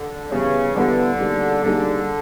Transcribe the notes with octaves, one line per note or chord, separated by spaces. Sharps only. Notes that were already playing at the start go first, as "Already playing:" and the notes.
Already playing: D3
C#3 E3 G3 B3 E4 G4
D3 E3 G3 B3 E4 G4
G3 A#3 D#4 G#4
D3 G3 A#3 D#4 G#4